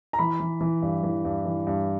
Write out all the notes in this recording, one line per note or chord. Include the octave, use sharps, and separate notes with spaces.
A#5
E3 B5
E3
E3
G2
E3
G2
E3
G2